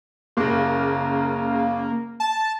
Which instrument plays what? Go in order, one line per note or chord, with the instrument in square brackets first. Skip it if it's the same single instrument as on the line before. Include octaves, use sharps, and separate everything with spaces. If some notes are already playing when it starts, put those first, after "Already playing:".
[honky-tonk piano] F#1 C#3 [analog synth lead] A#3
[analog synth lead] A5